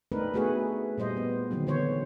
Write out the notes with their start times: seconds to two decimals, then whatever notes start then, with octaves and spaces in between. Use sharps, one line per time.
0.12 A3 C4 D4 D#4 A#4 B4
0.34 A3 B3 F#4 G#4 B4
0.98 A#2 G3 C5 D#5
1.17 B3
1.51 D3 D#3 F#3 C4
1.67 D3 E3 B3 C5 C#5